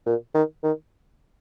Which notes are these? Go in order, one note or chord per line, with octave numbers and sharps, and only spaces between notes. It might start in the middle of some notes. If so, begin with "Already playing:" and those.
A#2
D#3
D#3